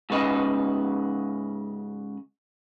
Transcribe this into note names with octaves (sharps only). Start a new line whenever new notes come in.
G#2 C#3 B4 D#5 G#5